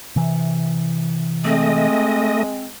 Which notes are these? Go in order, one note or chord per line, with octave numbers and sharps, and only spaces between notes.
C3 E3
G#3 A3 C4 D#5